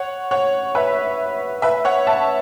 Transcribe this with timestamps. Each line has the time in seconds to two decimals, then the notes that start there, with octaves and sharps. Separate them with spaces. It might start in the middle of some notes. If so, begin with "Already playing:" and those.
Already playing: C#5 F#5
0.31 C#5 F#5
0.75 B4 E5
1.62 B4 E5
1.85 C#5 F#5
2.07 E5 A5